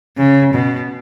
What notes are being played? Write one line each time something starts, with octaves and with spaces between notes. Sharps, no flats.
C#3
B2